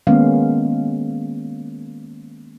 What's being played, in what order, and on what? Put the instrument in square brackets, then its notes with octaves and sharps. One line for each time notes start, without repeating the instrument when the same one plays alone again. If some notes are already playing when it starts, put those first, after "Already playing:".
[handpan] D#3 G#3 A#3 B3 C#4 F5